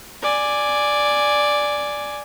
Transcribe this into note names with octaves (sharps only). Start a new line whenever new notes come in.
D5 G#5